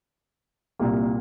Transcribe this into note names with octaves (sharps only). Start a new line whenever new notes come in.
C2 A#2 G3 A#3